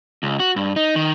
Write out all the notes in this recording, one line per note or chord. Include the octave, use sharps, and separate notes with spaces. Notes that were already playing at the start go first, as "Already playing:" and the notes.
C#2
F#4
G2
D#4
D#3